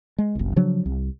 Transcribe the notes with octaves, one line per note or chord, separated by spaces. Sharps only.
G#3
F#1 C2
C#3 F3 F#3 D4
C2